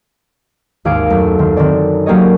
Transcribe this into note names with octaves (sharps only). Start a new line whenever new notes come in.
G#1 D#2 G#4 F5 D6 D7
F#2 A3
D#3 C6
D#3 C4 D4 D5
F#3 A#3 G4 C#5 D#5